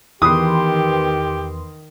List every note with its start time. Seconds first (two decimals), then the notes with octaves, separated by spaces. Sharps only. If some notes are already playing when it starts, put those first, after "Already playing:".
0.22 E2 D#3 G4 B4 C6 D#6